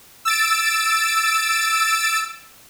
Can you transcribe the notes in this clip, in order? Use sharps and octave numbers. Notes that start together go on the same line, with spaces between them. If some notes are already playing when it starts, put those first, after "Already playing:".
E6 A6 D7